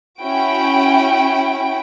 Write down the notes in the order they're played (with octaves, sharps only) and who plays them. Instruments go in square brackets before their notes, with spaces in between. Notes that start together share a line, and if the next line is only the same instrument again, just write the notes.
[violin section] C#4 E4 F#4 G5 D7